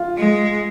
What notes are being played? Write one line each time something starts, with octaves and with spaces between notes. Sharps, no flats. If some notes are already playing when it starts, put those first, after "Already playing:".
Already playing: F4
G#3